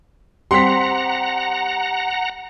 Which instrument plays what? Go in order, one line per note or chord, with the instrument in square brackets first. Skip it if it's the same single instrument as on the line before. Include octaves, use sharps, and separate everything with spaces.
[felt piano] G3 C4 [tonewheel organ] F#5 A#5 [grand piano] C6 B6